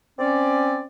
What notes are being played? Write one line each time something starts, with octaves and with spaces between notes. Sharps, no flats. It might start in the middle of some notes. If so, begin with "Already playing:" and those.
C4 C#4 D5